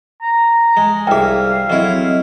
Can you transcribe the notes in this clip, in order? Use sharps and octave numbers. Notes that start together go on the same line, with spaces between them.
A#5
G#3
C2 G#4 E5 F5 G5
F#3 C4 E4 A4 D#5